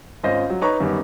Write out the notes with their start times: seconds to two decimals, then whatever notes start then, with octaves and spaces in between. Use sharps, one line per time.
0.23 G#1 C#4 F4 C5 D#5 A#6
0.50 F#3
0.61 D#4 B4 C#5 A#5 C#6
0.80 F#2 D#3 G3 B3